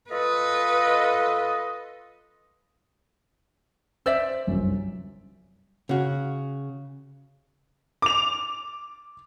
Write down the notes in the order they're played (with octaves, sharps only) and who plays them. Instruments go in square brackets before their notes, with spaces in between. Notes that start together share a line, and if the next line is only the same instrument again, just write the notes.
[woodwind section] F4 A4 D#5 [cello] B4
[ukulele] C5 D5 E5 [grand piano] E6
[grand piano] G1 C2 F#2
[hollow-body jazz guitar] C#3 F#4
[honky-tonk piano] D6 F7